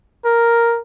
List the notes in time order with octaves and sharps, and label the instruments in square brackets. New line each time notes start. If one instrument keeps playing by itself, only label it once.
[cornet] A#4